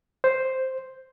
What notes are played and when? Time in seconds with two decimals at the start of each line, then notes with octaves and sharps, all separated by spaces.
0.24 C5